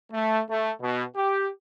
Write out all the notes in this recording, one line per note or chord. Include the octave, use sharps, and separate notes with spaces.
A3
A3
B2
G4